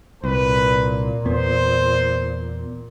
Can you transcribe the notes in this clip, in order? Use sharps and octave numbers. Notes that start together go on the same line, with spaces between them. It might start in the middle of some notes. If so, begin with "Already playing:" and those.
C2 A#2 B4
E2 B3 C5